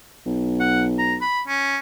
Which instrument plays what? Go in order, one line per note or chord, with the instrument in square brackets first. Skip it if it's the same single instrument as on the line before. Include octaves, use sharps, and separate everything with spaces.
[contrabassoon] B1
[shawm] F#5
A#5
B5
C#4